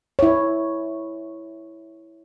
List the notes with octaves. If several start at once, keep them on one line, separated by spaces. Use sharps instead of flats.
E4 C#5